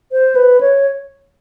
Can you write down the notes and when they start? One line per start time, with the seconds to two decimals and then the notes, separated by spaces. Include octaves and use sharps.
0.12 C5
0.35 B4
0.61 C#5